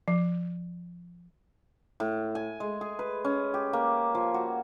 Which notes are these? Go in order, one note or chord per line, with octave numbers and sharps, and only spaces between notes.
F3
A2
G#5
G#3
G#4
B4
C#4
G4
A#3
F3
F#4